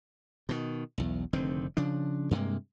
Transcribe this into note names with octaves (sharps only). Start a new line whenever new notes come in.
B2 D#3
B1 E2
F1 D3 D#3 C4
C#3 F3 D4
G2 C3 G#3 A#3